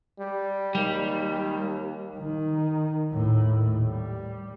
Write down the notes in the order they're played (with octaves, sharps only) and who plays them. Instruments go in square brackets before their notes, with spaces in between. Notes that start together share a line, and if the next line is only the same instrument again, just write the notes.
[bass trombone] G3
[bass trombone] D#2 [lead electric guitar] G3
[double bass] D#3
D#2 A2
G3